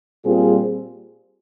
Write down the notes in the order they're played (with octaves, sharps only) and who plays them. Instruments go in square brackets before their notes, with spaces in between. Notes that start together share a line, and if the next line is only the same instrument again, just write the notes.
[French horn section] A#2 G3 C4 F4 G#4